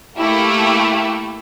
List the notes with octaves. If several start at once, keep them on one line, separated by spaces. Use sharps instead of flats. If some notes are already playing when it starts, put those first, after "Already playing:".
A3 A#3 E4 G4